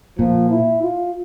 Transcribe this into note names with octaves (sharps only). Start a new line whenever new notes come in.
A#2 F3
E4
F4